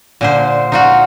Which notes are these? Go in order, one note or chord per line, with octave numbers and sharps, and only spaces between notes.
A#2 D3 C5
D#4 F4 F#4